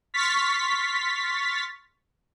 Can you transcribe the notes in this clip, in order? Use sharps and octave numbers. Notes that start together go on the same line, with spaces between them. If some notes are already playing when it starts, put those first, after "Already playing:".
C6 C#6 F6 A6 B6